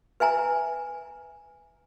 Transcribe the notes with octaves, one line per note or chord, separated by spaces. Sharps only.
B4 E5 G#5 A#5